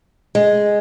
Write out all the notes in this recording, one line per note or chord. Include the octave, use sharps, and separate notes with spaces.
G#3